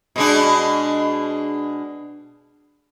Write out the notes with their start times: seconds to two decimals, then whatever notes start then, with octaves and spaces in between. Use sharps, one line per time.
0.16 B2 G#3 D4